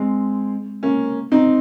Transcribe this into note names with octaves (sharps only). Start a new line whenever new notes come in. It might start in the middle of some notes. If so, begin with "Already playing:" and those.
Already playing: G#3 C4
A#3 C#4
C4 D#4